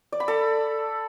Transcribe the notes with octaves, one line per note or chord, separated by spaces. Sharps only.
D5
B5
A4